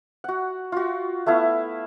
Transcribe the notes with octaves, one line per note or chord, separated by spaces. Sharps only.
F#4 F#5
F4 F#4
A3 B3 E4 F5